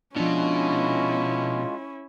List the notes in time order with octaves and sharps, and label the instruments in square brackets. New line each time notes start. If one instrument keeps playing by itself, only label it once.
[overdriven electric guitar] B2 [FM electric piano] F3 D4 [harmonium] G#3 F4 [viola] C#4 E4